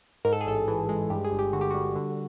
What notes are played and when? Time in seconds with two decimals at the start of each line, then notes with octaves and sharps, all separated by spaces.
0.25 G#2 A#4
0.33 A4
0.41 G#4
0.46 A1 A4
0.68 E3
0.89 G#3
1.10 G2 G4
1.24 G#4
1.32 G1
1.39 G4
1.53 D3 F#4
1.61 G4
1.71 G3 F#4
1.95 D3